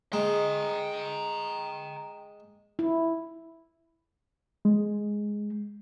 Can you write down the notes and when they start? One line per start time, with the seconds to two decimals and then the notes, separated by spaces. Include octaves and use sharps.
0.13 G#3 G5 A#5
2.79 E4
4.65 G#3